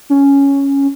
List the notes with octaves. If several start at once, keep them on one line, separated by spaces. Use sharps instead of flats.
C#4